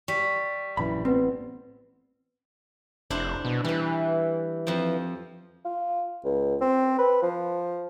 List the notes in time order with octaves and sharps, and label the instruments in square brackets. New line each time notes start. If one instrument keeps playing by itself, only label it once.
[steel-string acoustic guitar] G3 [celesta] C#6 B6
[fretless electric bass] A#1 F#2 E3 [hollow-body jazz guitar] B5
[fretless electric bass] A1 B3 [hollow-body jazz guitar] C4 [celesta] B4
[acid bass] F1 [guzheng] D4 E4 C5
[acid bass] B2
[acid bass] E3 [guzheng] G3 B4
[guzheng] F2 F3
[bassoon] F4
C#2
C4
B4
F3